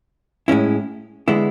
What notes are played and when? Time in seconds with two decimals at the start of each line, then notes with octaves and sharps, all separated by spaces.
0.48 A2 G#3 C#4 E4
1.28 D3 G#3 B3 E4